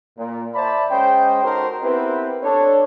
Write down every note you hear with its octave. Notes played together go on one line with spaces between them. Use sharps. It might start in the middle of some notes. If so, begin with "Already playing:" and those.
A#2
C5 D5 E5 A5 B5
G#3 C#4 C5 D#5 G5
D#4 F#4 A4 A#4 C5
B3 C4 E4 G4 A#4 B4
D4 A4 C#5